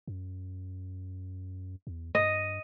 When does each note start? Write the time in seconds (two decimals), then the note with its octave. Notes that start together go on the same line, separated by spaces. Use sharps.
0.07 F#2
1.87 E2
2.15 G2 D#5